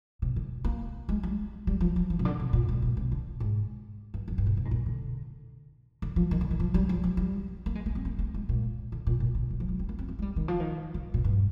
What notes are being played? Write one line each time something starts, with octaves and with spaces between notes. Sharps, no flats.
C3
D3
A#3
G#3
G3
G3
F3
F3
F3
C3
D3
C3
A#2
G#2
A#2
C3
D3
G#2
G2
F2
G2
A#2
C3
G#2
A#2
D3
D3
F3
D#3
D3
D#3
F3
G3
F3
F3
G3
A#3
G#3
A#3
C4
A#3
A#3
G#3
A#2
D3
A#2
A#2
D3
D#3
F3
G3
C4
A#3
C4
A#3
G#3
G3
D#3
F3
D#3
D3
A#2
G2